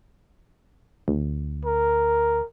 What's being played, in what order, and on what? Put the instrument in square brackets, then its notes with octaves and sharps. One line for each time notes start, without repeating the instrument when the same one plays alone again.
[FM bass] D2
[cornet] A#4